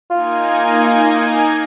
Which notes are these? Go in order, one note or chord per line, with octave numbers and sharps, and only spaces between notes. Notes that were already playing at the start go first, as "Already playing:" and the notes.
A#3 D#4 F4 G#5